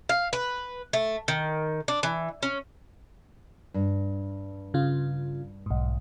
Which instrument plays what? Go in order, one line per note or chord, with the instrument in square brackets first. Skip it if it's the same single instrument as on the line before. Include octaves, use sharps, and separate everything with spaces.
[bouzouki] F5
B4
A3
D#3
D4
E3
C#4
[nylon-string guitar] G2
[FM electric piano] C#3 F4
B1 G#2